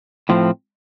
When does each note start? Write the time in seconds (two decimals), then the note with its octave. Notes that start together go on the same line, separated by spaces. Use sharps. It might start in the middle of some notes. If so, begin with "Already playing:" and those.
0.29 A2 F3 C4